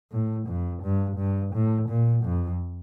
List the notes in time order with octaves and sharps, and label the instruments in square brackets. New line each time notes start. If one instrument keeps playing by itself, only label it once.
[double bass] A2
F2
G2
G2
A2
A#2
F2